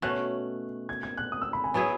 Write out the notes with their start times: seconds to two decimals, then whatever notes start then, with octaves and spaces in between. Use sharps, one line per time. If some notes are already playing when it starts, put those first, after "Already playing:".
0.02 B2 A3 C#4 F#6
0.89 G#6
1.03 G#6
1.18 F#6
1.32 D#6
1.42 E6
1.53 B5
1.64 G#5
1.74 F#3 B3 E4 G#4 G#5